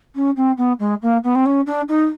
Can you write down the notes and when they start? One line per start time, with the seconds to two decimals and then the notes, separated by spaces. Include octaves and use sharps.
0.15 C#4
0.36 C4
0.57 B3
0.79 G#3
1.02 A#3
1.24 B3
1.35 C4
1.46 C#4
1.66 D4
1.88 D#4